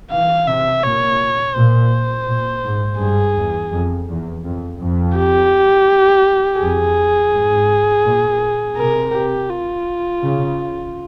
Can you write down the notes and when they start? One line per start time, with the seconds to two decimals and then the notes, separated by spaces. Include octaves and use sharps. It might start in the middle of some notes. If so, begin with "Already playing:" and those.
0.12 E3 F5
0.48 C3 E5
0.83 A#2 C#5
1.56 A#2 C5
2.28 A#2
2.65 G#2
3.00 G2 G#4
3.37 E2
3.72 F2
4.09 E2
4.44 F2
4.81 F2
5.17 G4
6.60 F2 G#4
7.32 G#2
8.04 A#2
8.76 C3 A#4
9.13 G4
9.49 F4
10.21 C#3